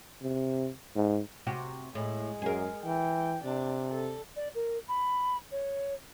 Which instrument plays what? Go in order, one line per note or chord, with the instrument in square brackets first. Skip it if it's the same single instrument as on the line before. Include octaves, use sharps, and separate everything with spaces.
[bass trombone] C3
G#2
[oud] C3 F#4 G4
[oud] A2 [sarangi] G#3
[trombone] F#2 [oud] G#4 A#4
[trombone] E3 [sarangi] G5
[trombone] C3 [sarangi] D4
[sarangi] A4
[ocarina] D5
A#4
B5
C#5